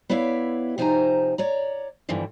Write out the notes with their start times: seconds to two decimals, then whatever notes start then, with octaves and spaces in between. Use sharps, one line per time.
0.10 B3 E4 C#5 D5 E5 F5
0.78 C3 F3 D#4 C5 G#5 A#5
1.38 C#5 D5 A#5
2.09 G2 B2 D3 E3 F3